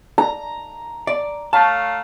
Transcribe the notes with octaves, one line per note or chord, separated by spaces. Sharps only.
A#5
D5
A3 C#5 F5 A5